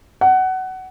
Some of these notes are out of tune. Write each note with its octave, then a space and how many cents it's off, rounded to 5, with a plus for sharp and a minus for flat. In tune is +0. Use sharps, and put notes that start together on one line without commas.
F#5 +20